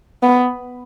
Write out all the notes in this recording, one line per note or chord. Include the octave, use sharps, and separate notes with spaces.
B3